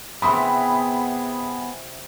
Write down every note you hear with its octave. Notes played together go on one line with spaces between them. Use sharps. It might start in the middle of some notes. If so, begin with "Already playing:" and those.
C3 E3 B3 C4 G#4 B5 C6 D#6